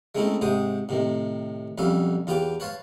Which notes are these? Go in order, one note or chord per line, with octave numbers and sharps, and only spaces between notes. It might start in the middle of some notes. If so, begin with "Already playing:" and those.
G#3 A3 C4 C#4 D#4 E4
G#2 C3 C5 G5 D#6
A2 C3 D#3
B1 F2 G3 C#4 E5 F5
E2 F4 G4 B4 G5 D6
B4 C#5 F5 A5 C6